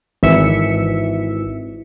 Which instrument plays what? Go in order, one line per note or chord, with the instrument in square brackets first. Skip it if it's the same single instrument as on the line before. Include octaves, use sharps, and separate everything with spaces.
[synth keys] G#1 E3 E5 C#7